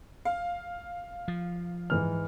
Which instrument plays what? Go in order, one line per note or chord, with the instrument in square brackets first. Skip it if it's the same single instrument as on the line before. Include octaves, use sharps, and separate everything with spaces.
[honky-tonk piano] F5
[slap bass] F3
[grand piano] G#2 E3 F6